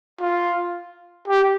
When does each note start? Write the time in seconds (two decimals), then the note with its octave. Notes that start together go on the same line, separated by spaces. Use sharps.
0.21 F4
1.28 G4